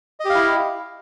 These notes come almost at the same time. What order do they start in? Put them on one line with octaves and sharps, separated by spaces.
D#5 G4 F5 E4